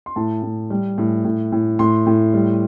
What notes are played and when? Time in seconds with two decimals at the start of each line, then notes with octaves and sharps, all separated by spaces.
0.06 C6
0.16 A2 A5
0.42 A2
0.70 G3
0.98 A2
1.25 A2
1.52 A2
1.79 A2 C6
2.06 A2
2.34 G3